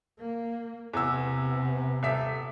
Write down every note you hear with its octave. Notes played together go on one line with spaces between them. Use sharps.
A#3
E2 C3 B3 E6
D#1 E5 B6